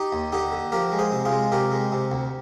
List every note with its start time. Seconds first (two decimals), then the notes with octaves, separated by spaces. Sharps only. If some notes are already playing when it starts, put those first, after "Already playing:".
Already playing: D#4 G4
0.12 D#2
0.32 D3 D#4 G4
0.52 D3
0.72 F3 G4 A#4
0.92 G#3
0.99 G#4 C5
1.12 C3
1.25 F4 G#4
1.32 G#3
1.52 C3 G4 A#4
1.72 G#3
1.92 C3
2.12 D2